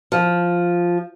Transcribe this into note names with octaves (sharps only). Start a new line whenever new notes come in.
F3